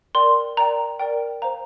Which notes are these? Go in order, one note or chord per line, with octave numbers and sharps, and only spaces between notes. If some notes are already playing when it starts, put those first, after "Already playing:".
A#4 D5 G5 C6
A#4 D5 G5 A#5
A#4 D5 G5
C5 F5 A#5